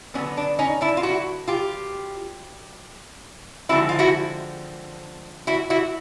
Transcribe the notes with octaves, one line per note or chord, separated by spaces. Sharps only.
D3 F#3 B3 C#4
D4
C#4 D#4
D4 E4
F4
E4 F#4
F4 G4
D3 F3 G#3 C4 E4 F#4
F4
E4 F#4
E4 F#4
E4 F#4